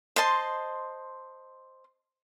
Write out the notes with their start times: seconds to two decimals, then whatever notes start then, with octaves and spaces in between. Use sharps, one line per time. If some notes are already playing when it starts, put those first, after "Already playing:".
0.16 C5 D#5 A5 C6